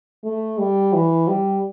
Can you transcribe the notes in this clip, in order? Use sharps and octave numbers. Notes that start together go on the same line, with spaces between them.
A3
G3
E3
G3